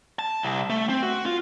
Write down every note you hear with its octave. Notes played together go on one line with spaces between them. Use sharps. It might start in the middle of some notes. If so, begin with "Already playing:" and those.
A5
C2
A3
C4
F#4
F4